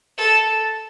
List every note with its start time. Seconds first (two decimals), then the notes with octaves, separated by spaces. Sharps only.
0.18 A4